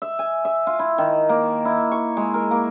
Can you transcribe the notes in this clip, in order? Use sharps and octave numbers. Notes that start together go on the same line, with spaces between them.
E5
G#5
E5
F4
E4
D#3
A#3
E4
C#6
G#3
A#4
A#3